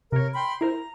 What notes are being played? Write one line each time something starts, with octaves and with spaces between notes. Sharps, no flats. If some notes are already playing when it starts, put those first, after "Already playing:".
C3 A#4 C#5
G5 B5 C6
E4 A#4 C5 A#5